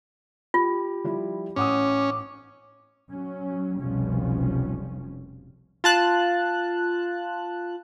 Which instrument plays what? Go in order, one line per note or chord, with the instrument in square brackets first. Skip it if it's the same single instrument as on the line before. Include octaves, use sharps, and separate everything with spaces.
[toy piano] F4 [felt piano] G4
[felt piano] F3 G3 E4
[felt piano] A1 F#5 D#6 [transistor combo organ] C#4 [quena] D6
[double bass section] F#3 C#4
F1 C2 B2 F3 G3 C#4
[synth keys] F4 A5 F#6